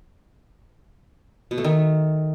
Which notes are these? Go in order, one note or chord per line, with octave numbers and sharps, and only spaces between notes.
B2
A3
D#3